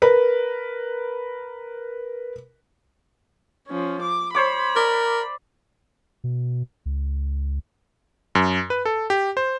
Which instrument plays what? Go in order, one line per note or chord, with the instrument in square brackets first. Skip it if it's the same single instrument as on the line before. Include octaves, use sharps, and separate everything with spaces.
[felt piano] A#4 B4
[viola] F3 C#4
D6
[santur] C5 C#5 D6 [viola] B5
[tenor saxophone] A#4 [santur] D5
[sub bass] B2
C#2
[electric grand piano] F#2
B4
A4
G4
C5